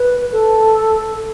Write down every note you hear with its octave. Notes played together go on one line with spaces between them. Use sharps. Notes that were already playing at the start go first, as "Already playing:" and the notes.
Already playing: B4
A4